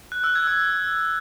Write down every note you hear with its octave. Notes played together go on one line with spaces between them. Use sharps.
F#6
E6
G#6
E6